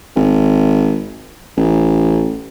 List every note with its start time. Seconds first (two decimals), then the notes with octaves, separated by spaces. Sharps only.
0.16 G#1
1.57 A1